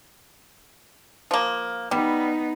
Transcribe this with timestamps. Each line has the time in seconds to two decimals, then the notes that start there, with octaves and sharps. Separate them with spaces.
1.31 F3 A#3
1.91 G3 B3 D#4